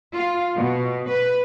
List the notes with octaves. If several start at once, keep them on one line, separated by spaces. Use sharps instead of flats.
F4
B2
B4